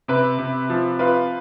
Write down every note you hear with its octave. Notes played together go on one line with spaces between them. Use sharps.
C3 B4
C3
F3
F4 B4